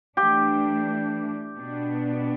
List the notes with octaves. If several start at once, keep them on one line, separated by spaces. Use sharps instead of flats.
E3 A3 D4 G4
B2 B3 D4